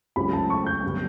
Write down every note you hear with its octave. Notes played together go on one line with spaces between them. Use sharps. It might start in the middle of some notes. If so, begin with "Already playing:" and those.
C#2 C#3 F#3 A3 B5
A5
C#6
G6
G2 D3 F#3 B3